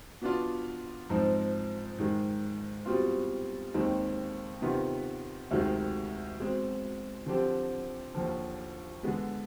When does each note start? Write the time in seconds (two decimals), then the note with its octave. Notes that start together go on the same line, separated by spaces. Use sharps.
0.22 B2 B3 D4 F4
1.10 G#2 F3 C4 D#4
1.98 G#2 D#3 G#3
2.85 B2 G3 C4 F4
3.74 D#2 D#3 G#3 C4 D#4
4.62 C3 D#3 B3 F4
5.51 D2 C3 D#3 G#3
6.39 B2 G#3 C4
7.26 D3 F3 C4 G4
8.15 D#2 D3 F3
9.03 D3 G#3 B3